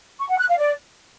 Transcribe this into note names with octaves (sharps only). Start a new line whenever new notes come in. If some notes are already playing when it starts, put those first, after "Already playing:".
C#6
F#5
F#6
F5
D5